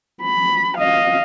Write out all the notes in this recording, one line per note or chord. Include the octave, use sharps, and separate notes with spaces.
B5
D#5 F5